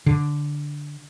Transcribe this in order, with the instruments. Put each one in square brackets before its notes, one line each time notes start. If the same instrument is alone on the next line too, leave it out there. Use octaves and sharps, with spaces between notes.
[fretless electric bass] D3